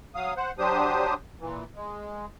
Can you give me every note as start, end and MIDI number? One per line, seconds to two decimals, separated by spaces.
0.15 0.34 54
0.15 0.34 77
0.15 0.34 87
0.37 0.52 72
0.37 0.52 78
0.59 1.14 54
0.59 1.14 62
0.59 1.14 67
0.59 1.14 72
0.59 1.14 87
1.40 1.64 46
1.40 1.64 52
1.76 2.26 56